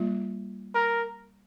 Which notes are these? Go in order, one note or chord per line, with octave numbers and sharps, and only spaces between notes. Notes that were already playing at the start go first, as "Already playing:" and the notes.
Already playing: G3 A#3 F4
A#4